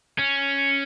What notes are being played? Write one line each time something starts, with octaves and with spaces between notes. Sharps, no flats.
C#4